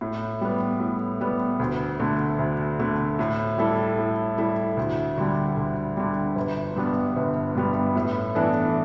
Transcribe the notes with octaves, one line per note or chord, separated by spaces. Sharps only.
A2
G3 B3
A2
G3 B3
D2
D3 A3
D2
D3 A3
A2
G3 E4 A4
A2
G3 E4 A4
D2
D3 G3
D2
D3 G3
G1
G2 G3 B3
G1
G2 G3 B3
A2
E3 B3 D4 A4